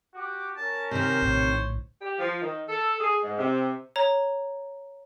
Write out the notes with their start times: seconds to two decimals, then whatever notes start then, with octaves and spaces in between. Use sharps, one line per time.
0.15 F#4 G4 D6
0.57 C#4 A#4 C#5 A5
0.91 C3 D#3 C5
1.22 A#1 A2 D3 C#5
2.02 G4
2.19 F3
2.41 D#3
2.69 A4
3.00 G#4
3.23 G#2
3.38 C3
3.96 C#5 A#5